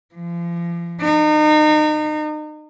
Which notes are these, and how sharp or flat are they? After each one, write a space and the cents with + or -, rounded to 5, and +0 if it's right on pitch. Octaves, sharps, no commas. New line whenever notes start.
F3 -35
D#4 -35